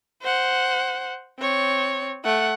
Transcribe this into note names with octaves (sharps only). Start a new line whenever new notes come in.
C5 F#5
C4 C#5
A3 F#5